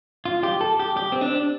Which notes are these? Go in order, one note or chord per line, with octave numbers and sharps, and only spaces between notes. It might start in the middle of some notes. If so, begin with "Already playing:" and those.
F4
G4
A4
G4
G4
C4
D4